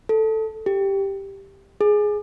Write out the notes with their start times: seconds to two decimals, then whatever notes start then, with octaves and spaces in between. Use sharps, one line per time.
0.09 A4
0.66 G4
1.81 G#4